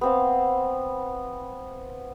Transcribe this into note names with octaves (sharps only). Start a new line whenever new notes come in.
B3 C4 F5